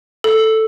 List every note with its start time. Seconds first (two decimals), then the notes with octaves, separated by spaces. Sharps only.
0.24 A4